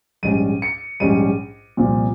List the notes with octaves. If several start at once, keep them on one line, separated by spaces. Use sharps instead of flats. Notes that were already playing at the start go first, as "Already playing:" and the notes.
A#1 G#2 G3 C#4 D#7
C#7
A#1 G#2 G3 C#4 D#7
C2 A#2 F3